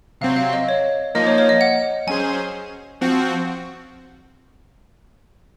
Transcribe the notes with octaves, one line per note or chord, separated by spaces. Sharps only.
C3 F#3 C4 F5
F5
D#5
C#5
F3 A#3 D#4 D#5
C#5
C#5
D#5
F#5
F#3 C#4 G#4 C5 G#5
F3 C4 F#4